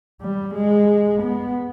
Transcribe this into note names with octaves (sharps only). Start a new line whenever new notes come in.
G3
G#3
B3